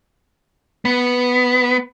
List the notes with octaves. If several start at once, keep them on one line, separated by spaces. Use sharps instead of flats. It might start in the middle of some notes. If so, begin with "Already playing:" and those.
B3